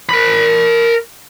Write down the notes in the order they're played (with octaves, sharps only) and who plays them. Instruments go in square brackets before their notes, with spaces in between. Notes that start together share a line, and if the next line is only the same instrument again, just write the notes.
[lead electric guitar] A#4 B5